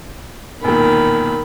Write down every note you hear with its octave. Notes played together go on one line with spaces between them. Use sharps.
E1 A#2 D#3 B5